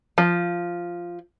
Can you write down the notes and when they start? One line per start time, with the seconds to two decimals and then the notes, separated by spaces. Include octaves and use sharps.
0.18 F3